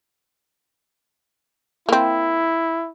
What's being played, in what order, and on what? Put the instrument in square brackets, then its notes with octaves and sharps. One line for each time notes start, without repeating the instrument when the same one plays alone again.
[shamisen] A#3 C4 [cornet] E4